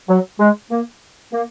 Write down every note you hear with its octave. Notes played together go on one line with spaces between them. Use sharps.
F#3
G#3
A#3
A#3